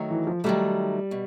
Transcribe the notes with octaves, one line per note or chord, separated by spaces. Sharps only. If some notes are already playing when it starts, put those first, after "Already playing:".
Already playing: D#3 F#3 A3
E3
F3
D#3 F#3 G3 A3
B2